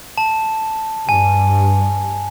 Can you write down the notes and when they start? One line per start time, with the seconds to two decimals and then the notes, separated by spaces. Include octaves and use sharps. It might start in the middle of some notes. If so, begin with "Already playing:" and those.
0.18 A5
1.09 G2 G#5